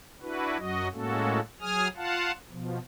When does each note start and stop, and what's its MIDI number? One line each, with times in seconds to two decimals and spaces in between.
0.22 0.57 62
0.22 0.57 64
0.22 0.57 66
0.22 0.57 71
0.58 0.88 42
0.58 0.88 54
0.58 0.88 66
0.58 0.88 75
0.93 1.40 45
0.93 1.40 56
0.93 1.40 58
0.93 1.40 61
0.93 1.40 66
0.93 1.40 69
1.61 1.88 54
1.61 1.88 68
1.61 1.88 80
1.61 1.88 87
1.61 1.88 89
1.96 2.32 65
1.96 2.32 77
1.96 2.32 78
1.96 2.32 81
2.49 2.79 47
2.49 2.79 53